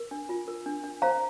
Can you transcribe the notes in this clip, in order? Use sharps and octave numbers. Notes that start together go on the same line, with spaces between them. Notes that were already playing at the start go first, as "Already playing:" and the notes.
Already playing: A#4
D4
F4
A#4
D4
D4
C5 F5 A#5